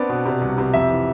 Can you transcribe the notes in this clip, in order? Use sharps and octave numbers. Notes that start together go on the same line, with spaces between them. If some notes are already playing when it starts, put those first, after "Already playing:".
Already playing: B3 C4 D4 D5
B2
C3
C2
C3
F2 E5
E3